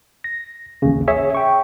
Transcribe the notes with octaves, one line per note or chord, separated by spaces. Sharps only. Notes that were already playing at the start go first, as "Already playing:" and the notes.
A#6
A1 D#2 C#3
G#4 C#5 E5
G5 C#6